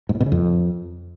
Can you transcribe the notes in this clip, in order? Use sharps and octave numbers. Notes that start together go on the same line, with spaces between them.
G#2
A2
B2
C#3
F2